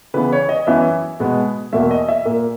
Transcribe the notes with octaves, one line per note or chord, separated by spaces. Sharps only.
C#3 E3 B3 B4
C#5
D#5
F#2 E3 B3 E5
B2 G#3 B3
E2 B2 A#3 E5
D#5
E5
A#2 A#3